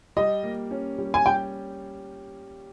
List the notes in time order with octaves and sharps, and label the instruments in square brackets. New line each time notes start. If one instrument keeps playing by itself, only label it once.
[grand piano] G3 [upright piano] D#5
[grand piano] A#3
C#4
G3
[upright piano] G#5
[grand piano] G3 [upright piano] G5